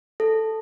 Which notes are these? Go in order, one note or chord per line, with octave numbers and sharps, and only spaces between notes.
A4